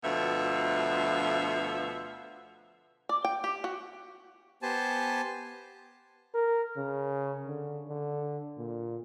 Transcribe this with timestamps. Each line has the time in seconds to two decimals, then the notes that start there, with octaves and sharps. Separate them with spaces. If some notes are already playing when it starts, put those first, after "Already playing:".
0.03 D2 B2 F3 E5
3.09 D5
3.25 G5
3.44 G4
3.64 F#4
4.63 B3 G4 C5 G#5 A5
6.35 A#4
6.77 C#3
7.48 D3
7.89 D3
8.58 A#2